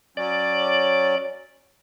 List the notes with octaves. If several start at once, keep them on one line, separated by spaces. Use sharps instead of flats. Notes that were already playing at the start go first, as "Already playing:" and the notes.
F#3 C#4 D5